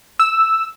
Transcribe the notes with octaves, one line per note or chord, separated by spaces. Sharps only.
E6